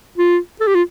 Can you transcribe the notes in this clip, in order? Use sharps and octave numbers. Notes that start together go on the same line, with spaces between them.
F4
A4
G4
F4